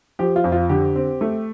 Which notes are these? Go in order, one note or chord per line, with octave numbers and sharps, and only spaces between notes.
F3 G4
F4
F2
F4
D3 G4
C4
A3